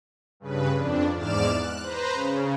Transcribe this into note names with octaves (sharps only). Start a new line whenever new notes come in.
G2 C#3 B4
F2 D4
E2 G#2 D5 D6 F6 E7
F#6
B4 C5 A#5
C#3